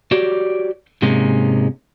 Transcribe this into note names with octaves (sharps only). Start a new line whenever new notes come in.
F#4 G4 C#5 D5
G#2 C3 G#3 A#3 C#4